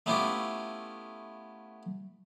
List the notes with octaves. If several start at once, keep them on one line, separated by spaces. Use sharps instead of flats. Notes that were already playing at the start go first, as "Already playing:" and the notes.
A3 B3 C#4 E4 F4 G4